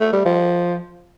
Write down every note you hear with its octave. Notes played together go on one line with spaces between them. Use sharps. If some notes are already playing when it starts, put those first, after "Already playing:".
A3
G3
F3